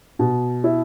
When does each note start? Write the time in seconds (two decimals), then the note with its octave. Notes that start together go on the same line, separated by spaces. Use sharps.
0.19 B2
0.64 E4